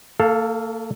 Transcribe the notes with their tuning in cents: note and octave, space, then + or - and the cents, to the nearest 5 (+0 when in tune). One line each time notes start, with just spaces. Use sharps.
A#3 -40 A4 +0 F5 +0